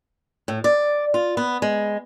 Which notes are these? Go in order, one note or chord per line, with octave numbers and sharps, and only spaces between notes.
A2
D5
F4
B3
G#3